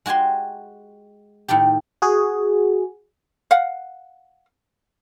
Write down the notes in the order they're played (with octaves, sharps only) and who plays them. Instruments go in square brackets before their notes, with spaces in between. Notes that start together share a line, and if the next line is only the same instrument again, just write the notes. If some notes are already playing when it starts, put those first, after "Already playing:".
[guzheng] G#3 F#4 G4 G#5 C6
A2 D#3 A3 G4
[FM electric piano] F#4 G#4
[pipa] F5 F#5